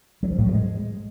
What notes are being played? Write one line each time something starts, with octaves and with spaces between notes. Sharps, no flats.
F#3
F3
A2
F3
G#3